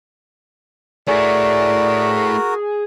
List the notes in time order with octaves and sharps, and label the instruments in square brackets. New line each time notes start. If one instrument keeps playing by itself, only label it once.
[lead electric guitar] A3 E4 [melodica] F#4 A#4 [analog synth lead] G#4 [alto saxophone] D5